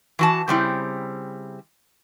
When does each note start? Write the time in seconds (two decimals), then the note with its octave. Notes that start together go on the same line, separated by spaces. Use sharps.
0.19 E3 F#4 A5
0.48 C#3 G3 C4 E4